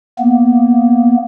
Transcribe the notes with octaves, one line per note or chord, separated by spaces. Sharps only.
A#3 B3